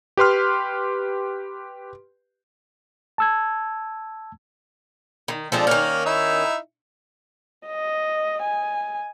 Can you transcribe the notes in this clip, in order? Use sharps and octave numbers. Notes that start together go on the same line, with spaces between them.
G4 B4 C6 F6
A5 E6 G#6
D#3
F3 G#3 C4 D4 A4
D#3 A#3 C#4 F6
D#4 E4 E5
D#5
G#5